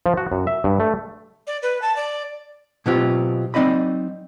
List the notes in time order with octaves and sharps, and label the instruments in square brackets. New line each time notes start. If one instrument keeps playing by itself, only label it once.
[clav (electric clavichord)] F3
F#4
F#2
E5
G2
A3
[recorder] D5
B4
A5
D5
[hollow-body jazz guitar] B2 F#3 B3 C4 F4 G4
F#3 C4 D#4 D5 D#5 B5